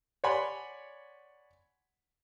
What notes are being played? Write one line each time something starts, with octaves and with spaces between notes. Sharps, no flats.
C#5 D5 F#5 G#5 B5 C6